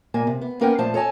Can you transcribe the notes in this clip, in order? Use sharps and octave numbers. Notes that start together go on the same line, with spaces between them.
A#2 A#3 G#5
C3
B3
A#3 C#4 A#4 B4 F#5 G5
A#2 F3 A3 C5 A5
A4 C#5 D#5 G#5 A5